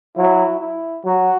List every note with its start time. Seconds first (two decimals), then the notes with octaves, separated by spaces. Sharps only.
0.17 F#3 E4
0.60 E4
1.05 F#3 F#4